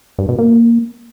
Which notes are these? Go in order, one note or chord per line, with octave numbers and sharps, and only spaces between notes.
G2
B2
A#3